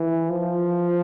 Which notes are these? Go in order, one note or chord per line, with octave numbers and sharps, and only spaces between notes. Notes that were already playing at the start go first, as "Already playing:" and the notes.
Already playing: E3
F3